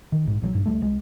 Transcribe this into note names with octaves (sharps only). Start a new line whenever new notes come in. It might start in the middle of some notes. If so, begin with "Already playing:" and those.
D#3
A#1 G#2
A#1 D#3 F#3
A#1 G2
C#2 F#2 G3 A3
C2 G#3